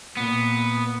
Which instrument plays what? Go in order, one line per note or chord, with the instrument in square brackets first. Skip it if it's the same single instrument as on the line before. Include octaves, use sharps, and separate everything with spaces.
[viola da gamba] A#2 [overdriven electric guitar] B3